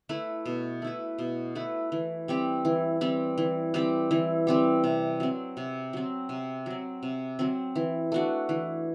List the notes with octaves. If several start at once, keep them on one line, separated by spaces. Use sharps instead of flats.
A3 E4 B4
B2
A3 E4 B4
B2
A3 E4 B4
E3
G3 C4 G4
E3
G3 C4 G4
E3
G3 C4 G4
E3
G3 C4 G4
C3
F#3 C4
C3
F#3 C4
C3
F#3 C4
C3
F#3 C4
E3
A3 D4 F#4
E3